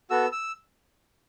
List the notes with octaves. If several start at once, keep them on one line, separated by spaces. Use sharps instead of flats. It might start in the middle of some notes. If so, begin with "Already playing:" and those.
B3 F#4 A4 E6
E6